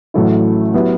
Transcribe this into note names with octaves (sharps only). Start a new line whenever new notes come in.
A1 A2 F#3 A3 E4
F#3 B3 E4 G4